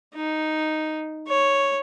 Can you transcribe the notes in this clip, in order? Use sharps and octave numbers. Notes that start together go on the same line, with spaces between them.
D#4
C#5